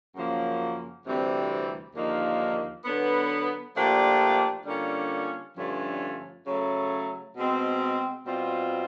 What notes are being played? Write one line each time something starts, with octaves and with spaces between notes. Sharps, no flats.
F#2 C#3 F3 A#3
D2 C3 E3 G3 C4
D#2 D3 F3 A#3 D#4
D3 F#3 B3
A#2 F3 A3 D4 G4
D3 G3 A#3 C#4 F4
G2 D3 F3 A3 C#4
C#3 F#3 A3
B2 G#3 C4
B2 G3 C4 F4